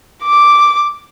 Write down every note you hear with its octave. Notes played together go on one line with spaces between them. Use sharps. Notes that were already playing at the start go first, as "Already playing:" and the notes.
D6